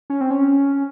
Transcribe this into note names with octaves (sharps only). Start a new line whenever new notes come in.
C#4
C4
C#4